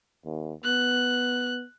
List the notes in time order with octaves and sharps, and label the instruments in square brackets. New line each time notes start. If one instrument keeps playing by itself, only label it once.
[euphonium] D#2
[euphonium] B3 [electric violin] F#6